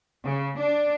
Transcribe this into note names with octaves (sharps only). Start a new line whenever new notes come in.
C#3
D4